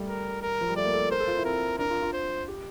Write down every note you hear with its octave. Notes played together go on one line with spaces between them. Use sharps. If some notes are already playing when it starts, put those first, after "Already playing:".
Already playing: G3 A3
A#4
A#4
F3
G3
A3 D5
A#3
A4
A#4 C5
A4
F4
E4
C4 A#4
D4 A#4
F4
F4
C5
G4